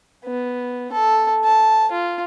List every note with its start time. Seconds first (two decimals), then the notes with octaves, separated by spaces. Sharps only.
0.25 B3
0.93 A4
1.45 A5
1.91 F4